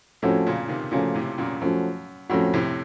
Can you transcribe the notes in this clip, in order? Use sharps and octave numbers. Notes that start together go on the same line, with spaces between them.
F2 A2 F3 A3 C#4 F#4
A#2 C#3
C3 D#3
A#2 C#3 F3 A3 C#4 F#4
A2 C3
F#2 A#2
F#2 F3 A3 C#4 F#4
F2 A2 F3 A3 C#4 F#4
A2 C3